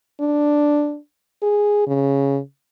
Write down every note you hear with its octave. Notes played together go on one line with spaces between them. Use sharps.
D4
G#4
C#3